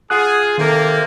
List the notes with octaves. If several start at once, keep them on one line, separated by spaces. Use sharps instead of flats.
F4 G#4 F#5 D#6 F#6
C3 D#3 A#3 A4